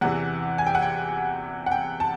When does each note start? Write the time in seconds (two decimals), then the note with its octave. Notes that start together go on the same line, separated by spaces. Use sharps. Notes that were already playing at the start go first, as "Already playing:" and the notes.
0.01 E2 C3 E3 F#5
0.58 G#5
0.67 G5
0.75 F#5
0.82 G5
1.66 F#5
1.71 G5
2.00 A5